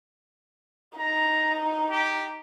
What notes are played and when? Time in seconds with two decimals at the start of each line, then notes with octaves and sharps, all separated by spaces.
0.97 D#4 A#5
1.91 G4